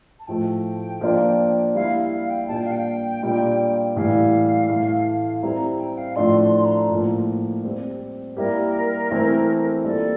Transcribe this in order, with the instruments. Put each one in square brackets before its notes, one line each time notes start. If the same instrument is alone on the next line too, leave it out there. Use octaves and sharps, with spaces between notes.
[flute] A5
[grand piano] A2 F3 A3 [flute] G5
[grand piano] F3 A#3 D4 F4
[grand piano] G3 A#3 E4 [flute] F5
[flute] F5
G5
[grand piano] A#2 G3 A#3 D4 F4 [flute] A5
[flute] G5
F5
G5
[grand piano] A#2 G3 D4 F4
[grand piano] A2 E3 G3 [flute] F5
[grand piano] A2 E3 A3 E4
[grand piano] G3 C4 E4 G4 [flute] A#5
[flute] A#5
G5
F5
[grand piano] A2 F3 A3 D4 [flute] C6
[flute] C6
C6
A#5
[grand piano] A2 F3 A#3
G3 C4 G4
[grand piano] G3 A#3 E4 G4 [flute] A#4
[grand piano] E3 A3 C4 E4
[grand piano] G3 A#3 D4 F4 [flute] A4